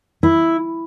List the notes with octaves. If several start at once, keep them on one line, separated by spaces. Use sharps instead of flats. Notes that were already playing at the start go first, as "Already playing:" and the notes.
E4